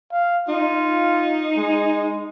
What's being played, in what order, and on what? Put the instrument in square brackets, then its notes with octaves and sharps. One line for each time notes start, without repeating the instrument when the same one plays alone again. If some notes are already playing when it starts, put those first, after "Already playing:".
[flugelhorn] F5
[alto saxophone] D#4 [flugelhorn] F4
[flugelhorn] G#3